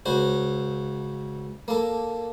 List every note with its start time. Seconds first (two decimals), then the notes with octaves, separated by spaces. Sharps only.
0.06 C#2 F#4 C5
1.68 A#3 A4